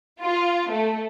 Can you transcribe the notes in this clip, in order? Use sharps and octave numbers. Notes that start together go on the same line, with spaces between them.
F4
A3